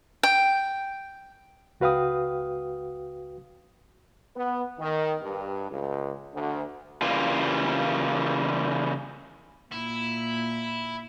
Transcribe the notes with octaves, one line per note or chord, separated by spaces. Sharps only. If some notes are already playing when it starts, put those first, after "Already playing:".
G5
C#2 F#4 B4 F5 G5 D#6
B3
D#3
G2
C#2
D2
C#3 E3 G3 A#3 F4
A#2 E4